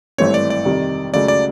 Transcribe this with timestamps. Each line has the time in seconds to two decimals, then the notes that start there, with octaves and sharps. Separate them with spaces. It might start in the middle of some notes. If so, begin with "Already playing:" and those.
0.18 G#1 G2 E3 A3 C4 C#5
0.34 D5
0.50 D5
0.65 F2 C3 D#3 G3
1.13 C#2 C#3 F#3 A3 D5
1.28 D5